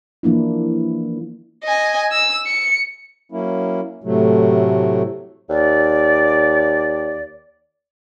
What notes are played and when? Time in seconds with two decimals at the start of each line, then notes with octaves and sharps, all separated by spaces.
0.23 E3 F3 A#3 D4 E4
1.64 D#5 G#5
2.12 E6
2.47 C#7
3.32 F#3 A#3 C#4 E4
4.04 A2 C3 F#3 A3
5.50 D#2 D5